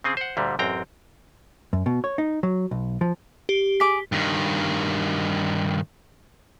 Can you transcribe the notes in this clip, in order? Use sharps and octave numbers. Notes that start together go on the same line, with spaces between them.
C#3 C4 G#4
C5 F#5
D2 A#2 D3 G3
A1 F#2 C4 G5 A#5
F#2
B2
C#5
D#4
F#3
B1
F3
G4
G#4 D6 B6
G2 D#3